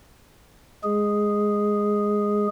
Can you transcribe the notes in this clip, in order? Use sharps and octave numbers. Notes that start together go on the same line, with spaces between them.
G#3 G#4